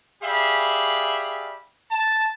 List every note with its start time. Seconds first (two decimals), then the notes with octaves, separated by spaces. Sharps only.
0.23 G4 G#4 D5 E5 F5 B5
1.90 A5